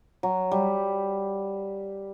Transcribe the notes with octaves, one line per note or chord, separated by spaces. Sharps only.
F#3
G3